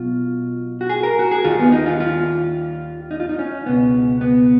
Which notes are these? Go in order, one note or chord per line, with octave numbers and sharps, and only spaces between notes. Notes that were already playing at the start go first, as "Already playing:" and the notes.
Already playing: B1 B2 F4
F#4
G#4
A#4
F#4
G#4
D#2 D#3 F4
B3
D#4
F4
F4
D#4
F4
D#4
C#4
C#2 B2 B3
B3